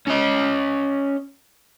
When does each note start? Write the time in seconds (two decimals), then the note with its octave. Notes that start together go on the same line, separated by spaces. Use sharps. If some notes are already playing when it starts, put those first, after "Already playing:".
0.07 C#4 D#5